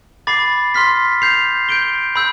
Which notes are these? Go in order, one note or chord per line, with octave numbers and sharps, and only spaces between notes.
B5 D6 A6 C7
C6 F6 B6
G6 C7 F7
G6 D7 G7
B5 E6 G6